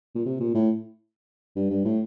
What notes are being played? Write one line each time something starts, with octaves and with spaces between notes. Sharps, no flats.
A#2
C3
A#2
A2
G2
G2
A2